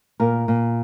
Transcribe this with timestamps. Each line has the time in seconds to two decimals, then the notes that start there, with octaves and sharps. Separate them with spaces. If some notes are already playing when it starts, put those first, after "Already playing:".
0.20 A#2 A#4
0.48 A#2